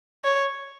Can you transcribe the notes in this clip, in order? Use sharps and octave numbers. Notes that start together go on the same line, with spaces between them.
C#5